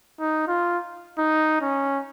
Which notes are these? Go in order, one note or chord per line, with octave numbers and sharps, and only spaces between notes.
D#4
F4
D#4
C#4